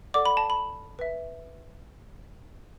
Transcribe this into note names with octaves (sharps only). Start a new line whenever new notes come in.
A4 D5 F#5 D6
B5
A5
B5
B4 E5